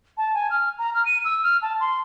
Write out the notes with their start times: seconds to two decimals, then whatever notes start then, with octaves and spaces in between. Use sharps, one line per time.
0.18 A5
0.34 G#5
0.51 F6
0.78 A#5
0.94 F6
1.05 D#7
1.25 E6
1.43 F6
1.62 A5
1.80 C6